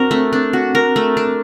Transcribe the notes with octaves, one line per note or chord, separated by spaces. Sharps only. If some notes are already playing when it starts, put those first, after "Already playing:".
Already playing: C4 D4 F#4 A#4
A3
D4
F#4
A#4
A3
D4